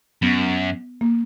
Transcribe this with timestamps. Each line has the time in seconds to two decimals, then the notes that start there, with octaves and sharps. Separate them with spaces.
0.22 F#2 B3
1.01 A#3